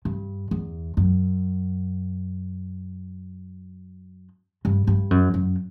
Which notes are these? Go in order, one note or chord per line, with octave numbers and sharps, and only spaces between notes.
G2
E2
F#2
G2
G2
F#2
F#2